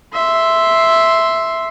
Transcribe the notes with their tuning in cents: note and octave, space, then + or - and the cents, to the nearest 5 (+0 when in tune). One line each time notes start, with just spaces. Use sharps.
E5 +0 C6 +0